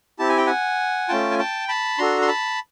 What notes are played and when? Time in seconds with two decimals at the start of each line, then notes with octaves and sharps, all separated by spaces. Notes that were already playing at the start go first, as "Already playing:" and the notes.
0.19 C4 E4 G4 A5
0.29 G#5
0.38 G5
0.46 F#5 G#5
1.08 A3 C#4 F4 G5 A5
1.31 G#5
1.38 G5 A5
1.68 A5 B5
1.98 D4 F#4 A4 A#5 C6
2.22 C6
2.28 A5 B5